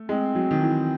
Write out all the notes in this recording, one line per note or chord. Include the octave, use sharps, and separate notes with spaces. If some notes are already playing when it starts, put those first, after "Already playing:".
Already playing: A3
G#3 C4
F#3
D#3
E3